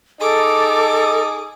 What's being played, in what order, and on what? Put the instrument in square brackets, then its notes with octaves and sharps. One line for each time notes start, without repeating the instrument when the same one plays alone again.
[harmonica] D#4 [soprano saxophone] G#4 [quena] A4 [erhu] D6